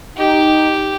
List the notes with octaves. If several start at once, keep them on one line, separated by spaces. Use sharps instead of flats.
D#4 G4